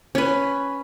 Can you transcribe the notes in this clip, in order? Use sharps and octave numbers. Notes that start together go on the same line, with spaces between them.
C#4 B4